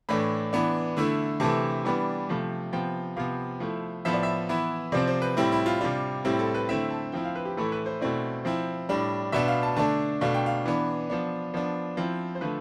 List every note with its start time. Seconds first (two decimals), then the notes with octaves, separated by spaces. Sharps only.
0.09 A2 E3 A3 D4 B5
0.53 E3 B3 D4
0.97 D3 A3 E4
1.40 C3 E3 A3 E4 A5
1.85 E3 G3 B3 D4
2.29 C3 F3 A3
2.72 C3 F3 B3 G5
3.16 C3 F3 B3 F5
3.60 F3 A3 E4
4.05 A2 F3 B3 E4 E5
4.13 D5
4.23 E5
4.49 E3 B3 E4
4.92 C3 F3 C4 D5
5.07 C5
5.22 B4
5.37 A2 G3 C4 E4
5.52 E4
5.66 F4
5.81 C3 G3 D4 F4
6.25 A2 G3 C4 E4 G4
6.39 A4
6.54 B4
6.69 D3 A3 C4 E4 E5
6.91 A5
7.12 F3 C4 E4 G5
7.24 F5
7.35 B4
7.45 G4
7.57 A2 E3 A3 E4 A4
7.72 B4
7.86 C5
8.01 B2 A3 C4 E4 D5
8.45 F3 C4 E4
8.89 A2 G3 D4
9.32 B2 B3 D4 E5
9.48 F5
9.63 A5
9.76 D3 A3 D4 A5
10.21 B2 A3 D4 F5
10.34 G5
10.46 F5
10.66 E3 B3 D4
11.10 F3 B3 D4
11.54 F3 B3 D4
11.97 F3 C4 E4
12.35 C5
12.41 D3 F3 A3 B4